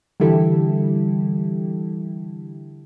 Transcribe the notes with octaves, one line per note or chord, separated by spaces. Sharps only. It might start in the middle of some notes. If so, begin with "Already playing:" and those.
D3 E3 G3 E4 G4 A4